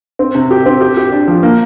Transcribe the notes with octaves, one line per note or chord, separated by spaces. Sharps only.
C4
C3
G4
C4
G4
G4
D4
F3
A#3